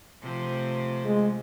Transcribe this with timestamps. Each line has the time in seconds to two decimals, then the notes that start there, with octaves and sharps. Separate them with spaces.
0.23 C3 F3 A3
1.05 G#3